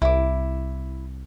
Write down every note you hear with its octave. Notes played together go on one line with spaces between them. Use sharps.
C2 E4 D6